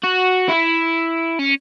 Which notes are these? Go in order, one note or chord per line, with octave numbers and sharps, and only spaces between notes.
F#4
E4
C#4